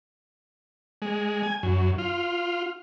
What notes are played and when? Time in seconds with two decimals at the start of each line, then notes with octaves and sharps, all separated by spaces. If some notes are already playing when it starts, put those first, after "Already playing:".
1.02 G#3
1.43 G#5
1.63 F#2
1.98 F4